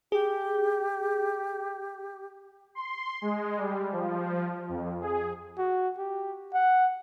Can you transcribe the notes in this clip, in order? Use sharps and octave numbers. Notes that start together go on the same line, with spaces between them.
G4 G#4
C6
G#3
G3
F3
F2
G#4
F#4
G4
F#5